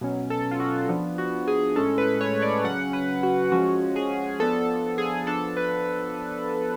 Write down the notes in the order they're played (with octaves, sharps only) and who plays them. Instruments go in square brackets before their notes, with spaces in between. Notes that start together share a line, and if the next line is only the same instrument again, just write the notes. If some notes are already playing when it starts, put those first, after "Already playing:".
[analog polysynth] B2 F#3 C#4
A4
F4
F#4
F3 B3 D4
F#4
G#4
A2 G#3 C#4 A4
B4
C#5
D5
C#3 F#3 C#4 F#5
B4
F#4
F3 G#3 C#4 F#4
G#4
F3 B3 D4 A4
A4
G#4
F3 B3 D4 A4
B4